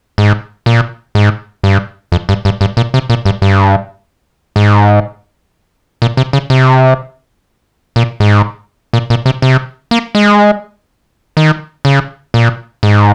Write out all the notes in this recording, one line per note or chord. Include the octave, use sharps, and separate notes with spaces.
G#2
A#2
G#2
G2
F2
G2
G2
G2
A#2
C3
A#2
G2
G2
G#2
A#2
C3
C#3
C3
A#2
G#2
A#2
A#2
C3
C3
A#3
G#3
D#3
C#3
A#2
G#2